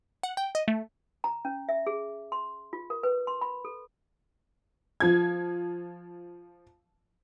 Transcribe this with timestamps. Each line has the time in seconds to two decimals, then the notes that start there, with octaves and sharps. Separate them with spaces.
0.23 F#5
0.37 G5
0.55 D#5
0.68 A3
1.24 A#5
1.45 C#4
1.69 E5
1.87 G#4
2.32 C6
2.73 F4
2.90 A#4
3.03 B4
3.27 C6
3.41 B5
3.65 A4
5.00 F3 G#6